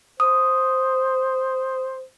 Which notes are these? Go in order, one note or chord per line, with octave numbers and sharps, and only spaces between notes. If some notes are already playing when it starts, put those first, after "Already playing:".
C5 D#6